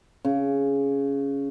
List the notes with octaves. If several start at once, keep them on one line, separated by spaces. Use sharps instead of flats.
C#3